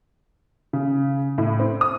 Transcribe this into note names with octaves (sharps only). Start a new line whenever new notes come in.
C#3
A2
C4
D#6